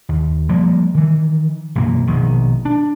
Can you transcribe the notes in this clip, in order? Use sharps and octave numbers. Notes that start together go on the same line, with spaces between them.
D#2
F3 G3 G#3 A#3
D#3 E3
B1 F#2 E3 A#3
A#1 B2 D#3
D4